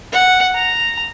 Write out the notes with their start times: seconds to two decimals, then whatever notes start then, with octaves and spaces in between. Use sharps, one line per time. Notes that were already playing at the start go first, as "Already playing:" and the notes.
0.12 F#5
0.55 A#5